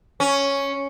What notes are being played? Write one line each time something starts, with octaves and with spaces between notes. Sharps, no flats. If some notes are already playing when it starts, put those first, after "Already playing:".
C#4